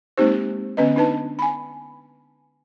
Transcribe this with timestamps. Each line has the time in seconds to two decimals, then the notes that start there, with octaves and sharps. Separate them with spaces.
0.18 G#3 A#3 C4 D#4 G4 C5
0.77 D3 B3 C#4 B4 D#5
0.96 D4 D#4 B4 A5
1.39 G#5 B5